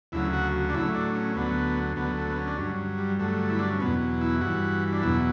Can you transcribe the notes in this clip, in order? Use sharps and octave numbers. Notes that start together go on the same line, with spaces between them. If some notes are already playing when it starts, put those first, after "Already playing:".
D2 C#3 F#3 E4
F#4
D4
A2 F#3 E4
D4
C#4
D2 D3 F#3 B3
D2 D3 F#3 B3
A3
B3
C#4
D4
G2 F#3 C#4
G3
G2 D3 F#3 A3
E4
D4
C#4
E2 B2 F#3 B3
E4
G2 E3 F#4
D4
E2 B2 F#3 E4